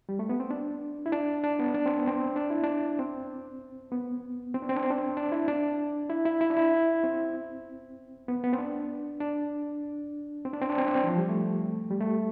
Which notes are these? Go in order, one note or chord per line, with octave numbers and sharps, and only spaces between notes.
G3
A3
B3
C4
D4
E4
D4
D4
B3
D4
C4
B3
C4
D4
E4
D4
C4
B3
C4
D4
C4
D4
C4
D4
C4
D4
E4
D4
E4
E4
E4
D4
E4
C4
B3
B3
C4
D4
D4
C4
D4
C4
D4
C4
D4
C4
E3
F3
G3
A3
G3
A3